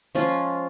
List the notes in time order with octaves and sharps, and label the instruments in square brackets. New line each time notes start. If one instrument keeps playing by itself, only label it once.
[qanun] F3 G#3 C#4 F4